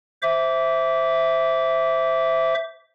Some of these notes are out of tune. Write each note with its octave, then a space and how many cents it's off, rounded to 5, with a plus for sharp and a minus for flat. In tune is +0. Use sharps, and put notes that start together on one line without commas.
C5 +0 E5 +0 D6 -25